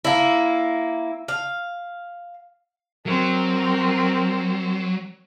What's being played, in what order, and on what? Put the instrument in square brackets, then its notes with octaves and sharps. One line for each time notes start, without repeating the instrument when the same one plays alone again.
[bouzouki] A#3 E4
F5
[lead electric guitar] F#3 [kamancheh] C4 A#4